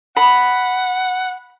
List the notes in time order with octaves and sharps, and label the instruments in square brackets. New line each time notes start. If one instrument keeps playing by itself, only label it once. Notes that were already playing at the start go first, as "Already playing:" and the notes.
[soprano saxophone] F#5 [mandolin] B5